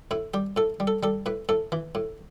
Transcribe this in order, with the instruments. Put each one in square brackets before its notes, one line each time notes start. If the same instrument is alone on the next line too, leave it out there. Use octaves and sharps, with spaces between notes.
[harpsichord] A2 E4
G3 G4
A2 A4
G3
A4
G3 A4
A2 B4
A2 A4
E3
A2